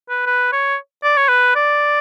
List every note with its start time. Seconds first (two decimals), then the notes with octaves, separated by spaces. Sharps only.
0.09 B4
0.27 B4
0.53 C#5
1.03 D5
1.17 C#5
1.29 B4
1.56 D5